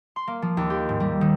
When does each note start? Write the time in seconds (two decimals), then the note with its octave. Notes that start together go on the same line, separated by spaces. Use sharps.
0.16 C6
0.27 A#3
0.42 F3
0.57 D#2
0.70 G4
0.89 G#2
1.00 G3
1.21 D#3